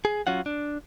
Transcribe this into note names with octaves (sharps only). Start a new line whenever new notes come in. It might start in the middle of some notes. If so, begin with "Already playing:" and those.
G#4
F#3 C#4 F4 F#5
D4